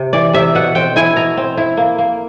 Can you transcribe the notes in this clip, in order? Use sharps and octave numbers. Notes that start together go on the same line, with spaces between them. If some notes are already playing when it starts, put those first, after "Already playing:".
Already playing: C3
E3 D5
C3 E5
B2 F#5
C4 G5
E4 G#5
B2 A#5
C4
E4
A#3
A#3